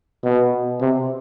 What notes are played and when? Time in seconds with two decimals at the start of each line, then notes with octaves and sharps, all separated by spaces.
0.24 B2
0.81 C3